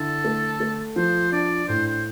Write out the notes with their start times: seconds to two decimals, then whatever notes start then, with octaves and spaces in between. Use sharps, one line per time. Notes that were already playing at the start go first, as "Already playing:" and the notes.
Already playing: D3 E4 A4
0.24 A3
0.60 A3
0.96 F3 C5
1.32 D4 D5
1.68 A2 C5
1.86 C5